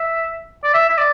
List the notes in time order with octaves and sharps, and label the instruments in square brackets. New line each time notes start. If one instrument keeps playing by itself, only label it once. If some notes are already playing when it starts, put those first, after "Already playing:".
Already playing: [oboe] E5
D5
E5
E5
D5